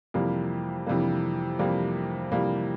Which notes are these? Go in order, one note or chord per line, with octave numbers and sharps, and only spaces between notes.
F2 C3 E3 G3 A#3
F2 C3 E3 G3 A#3
F2 C3 E3 G3 A#3
F2 C3 E3 G3 A#3